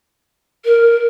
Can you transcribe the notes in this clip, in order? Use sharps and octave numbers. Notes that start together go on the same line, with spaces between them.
A#4